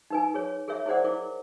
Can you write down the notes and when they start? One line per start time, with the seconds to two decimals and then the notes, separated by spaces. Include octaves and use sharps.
0.10 D#4 B4 G#5
0.34 G#4 C#5
0.68 G#4 A#4 C#5 E5
0.86 E4 G#4 A#4 C5 D5 F#5
1.04 E4 A#4 D6